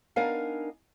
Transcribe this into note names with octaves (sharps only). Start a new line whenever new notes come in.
B3 D4 D#4 A#4 F5 G#5